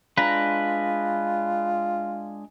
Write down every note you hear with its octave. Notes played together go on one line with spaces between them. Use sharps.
G#3 D4 F4 B4 A#5